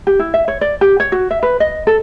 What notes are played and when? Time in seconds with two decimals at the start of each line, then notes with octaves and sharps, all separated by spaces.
0.07 G4
0.19 E4
0.34 E5
0.48 C#5
0.61 D5
0.81 G4
1.00 C#5
1.12 F#4
1.31 E5
1.43 B4
1.60 D#5
1.87 A4